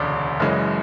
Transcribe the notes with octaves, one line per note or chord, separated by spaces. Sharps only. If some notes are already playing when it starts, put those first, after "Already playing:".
Already playing: E1 D2 C#3 D5
F#1 F#2 C#3 E3 G#3